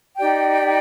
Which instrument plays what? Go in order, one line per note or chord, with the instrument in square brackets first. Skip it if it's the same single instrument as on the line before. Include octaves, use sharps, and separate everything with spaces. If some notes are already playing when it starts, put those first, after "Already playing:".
[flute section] D#4 G4 D5 G5